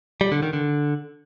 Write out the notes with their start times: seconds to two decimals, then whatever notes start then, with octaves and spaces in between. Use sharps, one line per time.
0.21 G3
0.32 D3
0.43 D#3
0.53 D3